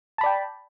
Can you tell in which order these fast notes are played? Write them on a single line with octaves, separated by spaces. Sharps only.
A5 B5 D5 G5